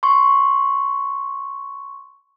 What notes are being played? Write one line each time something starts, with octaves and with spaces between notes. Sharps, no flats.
C6 C#6